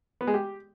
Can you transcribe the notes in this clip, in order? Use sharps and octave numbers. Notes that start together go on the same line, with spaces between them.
B3
G#3
G4